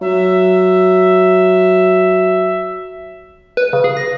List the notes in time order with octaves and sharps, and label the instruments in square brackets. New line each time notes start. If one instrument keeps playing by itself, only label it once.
[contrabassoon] F#3 [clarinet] E5
[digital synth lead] B4
C#3
G#4
A#6